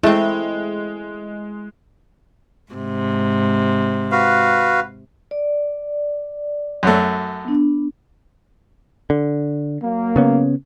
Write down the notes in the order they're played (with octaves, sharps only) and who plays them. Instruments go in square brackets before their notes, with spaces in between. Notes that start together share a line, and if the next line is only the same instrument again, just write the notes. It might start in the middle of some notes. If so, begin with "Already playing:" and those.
[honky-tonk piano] G#3 [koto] A3 C4 [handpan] E4
[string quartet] G#2 C3
[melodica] F#4 B4 F5
[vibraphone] D5
[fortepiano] F#2 F#3 A3
[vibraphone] B3 D4
[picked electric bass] D3
[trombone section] F#3 A#3
[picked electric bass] C#3 B3 C#4